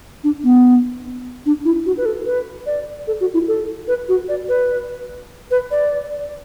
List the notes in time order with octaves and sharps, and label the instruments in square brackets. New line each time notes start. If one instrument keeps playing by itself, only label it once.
[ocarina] D4
B3
D4
E4
F#4
B4
A4
B4
D5
A4
F#4
E4
A4
B4
F#4
D5
B4
B4
D5